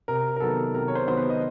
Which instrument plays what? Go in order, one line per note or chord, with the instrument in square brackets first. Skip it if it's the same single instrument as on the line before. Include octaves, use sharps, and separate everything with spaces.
[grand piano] C3 A#4
A#4
D#3 F#3 B3 A4
C3 A#4
C#5
C5
D#3 F#3 B3 C5
B4
D#5